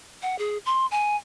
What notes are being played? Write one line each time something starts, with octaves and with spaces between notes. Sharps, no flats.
F#5
G#4
C6
G#5